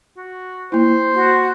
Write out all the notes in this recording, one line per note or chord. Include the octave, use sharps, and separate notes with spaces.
F#4
A#3 E4 C5
F#4